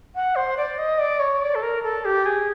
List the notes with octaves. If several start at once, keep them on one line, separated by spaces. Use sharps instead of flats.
F#5
C5
D5
D#5
D5
C#5
D5
A4
A#4
A4
G4
G#4